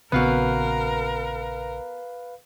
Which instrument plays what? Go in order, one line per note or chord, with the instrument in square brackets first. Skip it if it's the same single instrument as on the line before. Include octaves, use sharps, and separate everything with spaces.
[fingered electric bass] A#1 C#3 C4 [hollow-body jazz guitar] B3 F#4 [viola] A#4 [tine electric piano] B4 F5